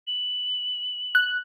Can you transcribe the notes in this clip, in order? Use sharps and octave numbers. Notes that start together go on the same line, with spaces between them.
F#7
F#6